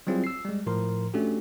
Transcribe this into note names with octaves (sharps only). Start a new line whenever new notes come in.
F#3 G3 C4 E4 F4 G#4
E6 C7
G3 G#3
A2 F3 A#4 C6
A3 C#4 D4 F#4 G4 A4